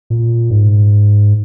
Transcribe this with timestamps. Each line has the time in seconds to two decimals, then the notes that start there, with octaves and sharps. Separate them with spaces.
0.10 A#2
0.50 G#2